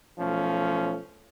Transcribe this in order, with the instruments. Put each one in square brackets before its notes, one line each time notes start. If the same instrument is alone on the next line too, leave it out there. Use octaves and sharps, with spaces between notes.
[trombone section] B1 F3 A3 C#4